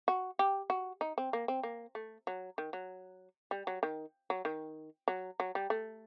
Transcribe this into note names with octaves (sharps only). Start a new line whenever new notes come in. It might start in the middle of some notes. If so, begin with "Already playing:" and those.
F#4
G4
F#4
D#4
C4
A#3
C4
A#3
A3
F#3
D#3
F#3
G3
F#3
D#3
F#3
D#3
F#3
F#3
G3
A3